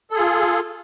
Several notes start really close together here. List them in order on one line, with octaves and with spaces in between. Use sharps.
A4 G#4 F4